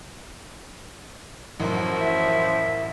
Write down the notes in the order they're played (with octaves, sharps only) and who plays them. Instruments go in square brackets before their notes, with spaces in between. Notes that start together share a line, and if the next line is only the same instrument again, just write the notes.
[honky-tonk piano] A1 F#2 [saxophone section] F3 F#3 E4
[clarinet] E5